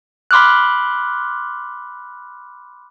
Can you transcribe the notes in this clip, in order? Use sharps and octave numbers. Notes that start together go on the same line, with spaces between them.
B5 C6 D6 F6 F#6